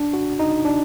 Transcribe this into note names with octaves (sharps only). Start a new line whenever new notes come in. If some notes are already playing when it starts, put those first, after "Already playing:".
Already playing: D4
F#4
D#4
D4